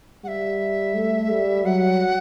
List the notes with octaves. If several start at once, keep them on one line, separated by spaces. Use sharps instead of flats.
G3 E5 F#5
A3
G3
F#3 F#5